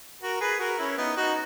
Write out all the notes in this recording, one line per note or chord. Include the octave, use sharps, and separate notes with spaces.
F#4 A#4
G#4 B4
F#4 A#4
C#4 E4
B3 D#4
D#4 F#4